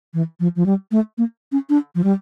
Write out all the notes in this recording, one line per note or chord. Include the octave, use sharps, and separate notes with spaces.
E3
F3
F3
G3
A3
A#3
C#4
D4
F3
G3